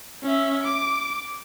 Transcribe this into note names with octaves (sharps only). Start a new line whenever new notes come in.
C#4 E5
D6